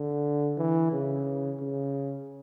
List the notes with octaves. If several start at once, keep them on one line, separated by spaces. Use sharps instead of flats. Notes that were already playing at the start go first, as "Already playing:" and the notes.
Already playing: D3
E3
C#3
C#3